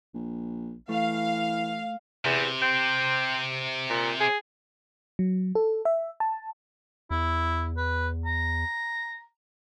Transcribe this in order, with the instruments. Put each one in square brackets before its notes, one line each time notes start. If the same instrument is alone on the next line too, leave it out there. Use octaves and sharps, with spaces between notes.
[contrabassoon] A#1
[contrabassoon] E3 [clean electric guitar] A3 [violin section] F5
[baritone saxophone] E2 [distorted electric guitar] C3
[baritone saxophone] C4
A#2
G#4
[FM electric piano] F#3
A4
E5
A5
[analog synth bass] E2 [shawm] E4
[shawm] B4
A#5